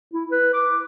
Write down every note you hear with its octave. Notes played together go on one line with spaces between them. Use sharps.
E4
B4
D6